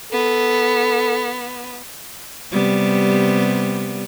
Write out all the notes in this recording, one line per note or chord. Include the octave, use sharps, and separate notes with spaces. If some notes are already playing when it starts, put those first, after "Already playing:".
B3 A4
C3 G3 B3